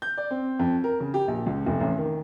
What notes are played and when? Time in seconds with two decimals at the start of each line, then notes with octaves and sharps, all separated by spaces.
0.02 G6
0.17 D5
0.31 C4
0.59 F2
0.84 A#4
1.00 C#3
1.14 G4
1.28 A#1
1.46 C#2
1.66 F1
1.81 A1
1.98 D#3